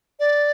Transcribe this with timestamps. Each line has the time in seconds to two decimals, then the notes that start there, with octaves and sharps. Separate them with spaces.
0.20 D5